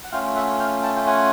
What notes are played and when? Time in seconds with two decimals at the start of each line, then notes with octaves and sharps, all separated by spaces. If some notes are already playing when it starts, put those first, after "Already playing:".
0.04 F#5
0.12 A3 C#4 F4 F5 G5
0.35 E5 F#5
0.59 F5 G5
0.83 G5 A5
0.96 G5
1.07 F#5 G#5